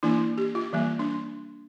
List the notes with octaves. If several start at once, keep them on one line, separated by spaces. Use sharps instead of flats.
E3 A#3 D4 E4
G4
F4
E3 G3 A#3
D4